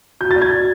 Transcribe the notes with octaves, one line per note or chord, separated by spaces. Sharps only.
F#4 G6
A6
D5
G#6
F#4